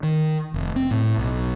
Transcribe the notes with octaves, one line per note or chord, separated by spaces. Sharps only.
D#3
F1
C4
A2
B1